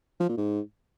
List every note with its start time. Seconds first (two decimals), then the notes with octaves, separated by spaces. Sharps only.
0.20 F3
0.29 A#2
0.37 G#2